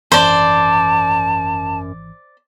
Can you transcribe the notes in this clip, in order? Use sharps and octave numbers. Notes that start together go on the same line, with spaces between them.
G#1 F#2 E3 C5 D5 A5